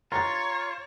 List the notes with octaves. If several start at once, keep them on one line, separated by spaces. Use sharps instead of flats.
F4 C#5 A#5 A6